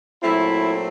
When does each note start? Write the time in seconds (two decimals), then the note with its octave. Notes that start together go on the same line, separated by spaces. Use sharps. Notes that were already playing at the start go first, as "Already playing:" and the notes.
0.22 A#2 F#3 A3 C4 E4